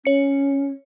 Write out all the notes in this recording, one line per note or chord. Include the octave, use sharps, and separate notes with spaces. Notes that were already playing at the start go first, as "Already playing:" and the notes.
C#4 C#5 C#7